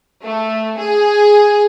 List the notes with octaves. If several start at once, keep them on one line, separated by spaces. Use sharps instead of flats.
A3
G#4